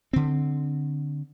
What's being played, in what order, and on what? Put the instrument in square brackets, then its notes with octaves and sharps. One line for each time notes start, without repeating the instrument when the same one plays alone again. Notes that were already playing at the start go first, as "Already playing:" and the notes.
[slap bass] D3 C4